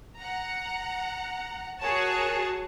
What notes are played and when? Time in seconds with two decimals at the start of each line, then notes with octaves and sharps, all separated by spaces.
0.18 F#5 A#5
1.80 F#4 G#4 A#4 C#5 A5